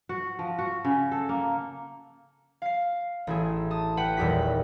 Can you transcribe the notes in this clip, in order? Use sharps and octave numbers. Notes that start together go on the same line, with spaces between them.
F#4
F3
F#4
C#3
A4
A#3
F5 C7
A1 E4 G#4
A5 D#6
B4 F#5 G5
D#1 E2 G4 B6